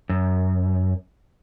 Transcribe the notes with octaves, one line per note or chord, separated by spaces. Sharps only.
F#2